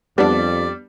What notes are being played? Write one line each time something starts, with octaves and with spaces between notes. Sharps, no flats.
F2 G3 B3 D4 D5